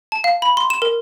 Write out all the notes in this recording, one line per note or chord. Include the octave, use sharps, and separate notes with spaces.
A5
F5
B5
C6
E7
A#4